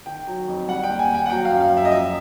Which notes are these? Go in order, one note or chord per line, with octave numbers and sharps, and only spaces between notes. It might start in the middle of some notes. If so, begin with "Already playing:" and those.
D#3 G5
F#3
F2
G3 F#5
G5
D#2
G#5
D#2
G5
F#5
F#3 G5
F5
F#2
F5
F#2
E5
D#5
F3 E5